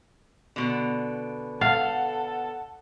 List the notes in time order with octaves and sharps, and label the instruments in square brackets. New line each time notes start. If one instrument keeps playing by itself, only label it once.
[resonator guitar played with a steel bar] B2 D3
[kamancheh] A4 [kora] F5 [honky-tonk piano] F#5 A6